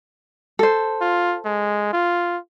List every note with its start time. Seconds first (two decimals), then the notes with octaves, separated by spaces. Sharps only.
0.59 A4 C5
1.01 F4
1.45 G#3
1.93 F4